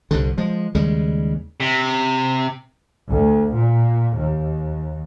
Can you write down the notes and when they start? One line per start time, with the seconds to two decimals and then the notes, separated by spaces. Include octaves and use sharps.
0.11 C2 G2 D3
0.37 F3 G#3
0.75 D#2 C#3 G3 G#3
1.60 C3
3.09 D2
3.55 A#2
4.18 D#2